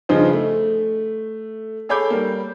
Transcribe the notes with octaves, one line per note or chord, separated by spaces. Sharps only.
G2 C#3 F3 D#4 C5
A3
G#4 A4 C#5 B5 D6 G6
G3 A#3